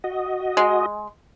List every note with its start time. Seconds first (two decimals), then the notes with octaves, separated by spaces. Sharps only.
0.04 F#4 D#5
0.57 G#3